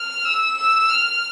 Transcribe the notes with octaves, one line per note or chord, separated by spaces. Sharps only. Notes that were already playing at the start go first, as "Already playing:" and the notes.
Already playing: F6
E6
E6
F6